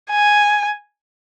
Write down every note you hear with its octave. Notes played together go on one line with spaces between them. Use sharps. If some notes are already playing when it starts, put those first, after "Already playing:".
G#5